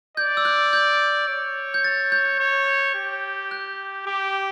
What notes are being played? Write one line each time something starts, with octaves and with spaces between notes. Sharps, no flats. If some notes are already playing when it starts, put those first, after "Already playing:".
D5 G6
E6
F#6
G6
C#5
G6
A6
G6
C#5
G4
F#6
G4 D6